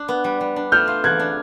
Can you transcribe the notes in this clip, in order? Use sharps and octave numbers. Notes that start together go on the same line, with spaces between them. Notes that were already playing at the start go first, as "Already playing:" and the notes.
Already playing: D4
B3
G3
G3
D4
A3 F6 G6
F4
E3 F#6 G#6
D4